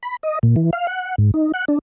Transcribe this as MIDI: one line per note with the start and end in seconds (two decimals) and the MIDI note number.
0.03 0.16 83
0.23 0.39 75
0.43 0.56 46
0.56 0.70 52
0.73 0.87 77
0.87 1.15 78
1.18 1.31 44
1.34 1.52 63
1.54 1.65 78
1.68 1.79 62